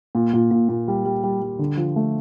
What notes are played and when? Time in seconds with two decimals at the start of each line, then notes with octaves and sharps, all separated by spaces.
0.15 A#2
0.33 A#2
0.51 A#2
0.69 A#2
0.88 G3
1.06 G3
1.23 G3
1.42 G3
1.59 D3
1.77 F3
1.96 A3